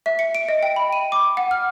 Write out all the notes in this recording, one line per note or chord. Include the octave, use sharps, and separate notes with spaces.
E5
C#7
D7
D#5
G5
B5
D#7
D6
F#5
F6